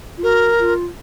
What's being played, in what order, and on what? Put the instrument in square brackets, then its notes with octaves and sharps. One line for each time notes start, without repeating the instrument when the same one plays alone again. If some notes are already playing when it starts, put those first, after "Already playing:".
[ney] F4
[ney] F#4 [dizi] A#4
[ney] F4